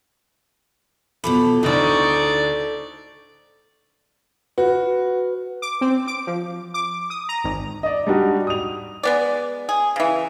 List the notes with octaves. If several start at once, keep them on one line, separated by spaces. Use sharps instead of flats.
B2 F3 A4 B5 D6
D2 A2 D3 D#4 A4 C5 D5 C#6
F#4 B4
D6
C4
D6
F3
D6
D#6
A#5
G#1
D5 D#5
G3 D4 D#4 F#4 G4
D#6 F7
G#3 B3 D5
G#4
C#3 E3